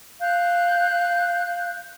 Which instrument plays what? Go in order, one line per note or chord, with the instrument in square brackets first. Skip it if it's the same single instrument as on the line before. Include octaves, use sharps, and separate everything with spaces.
[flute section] F5 F#6 G6